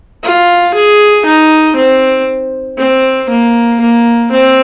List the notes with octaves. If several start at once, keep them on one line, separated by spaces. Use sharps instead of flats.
F4
G#4
D#4
C4
C4
A#3
A#3
C4